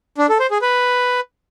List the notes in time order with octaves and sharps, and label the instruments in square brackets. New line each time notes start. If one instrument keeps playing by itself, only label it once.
[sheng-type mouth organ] D4
A4
C5
G#4
B4